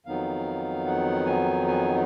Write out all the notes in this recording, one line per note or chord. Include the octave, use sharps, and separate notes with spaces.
F2 D#3 F#3 B3 D#4 F5
F#5
G#5
G#5